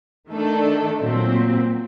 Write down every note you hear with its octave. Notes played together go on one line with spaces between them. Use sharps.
D#3 A3 D4 A4
A#2 F#3 C4